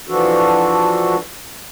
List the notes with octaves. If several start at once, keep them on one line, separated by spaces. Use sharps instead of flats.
E3 F3 D4 F#4 A4